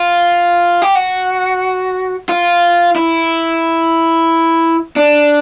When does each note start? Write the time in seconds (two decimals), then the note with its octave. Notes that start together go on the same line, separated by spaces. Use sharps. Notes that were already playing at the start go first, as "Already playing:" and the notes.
Already playing: F4
0.82 G4
0.95 F#4
2.29 F4
2.96 E4
4.96 D4